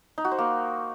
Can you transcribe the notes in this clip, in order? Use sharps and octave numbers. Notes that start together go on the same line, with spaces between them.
D#4
F#4
C5
A#3